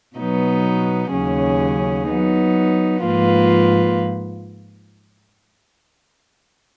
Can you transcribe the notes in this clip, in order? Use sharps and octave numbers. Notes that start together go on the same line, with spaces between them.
B2 F#3 B3 D#4
D#2 C#3 F#3 C#4 G#4
F#3 B3 D#4
G#2 F3 A#3 F4 B4